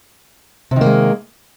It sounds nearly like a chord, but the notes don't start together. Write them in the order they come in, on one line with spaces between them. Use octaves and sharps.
C3 D#3 A#3 G#3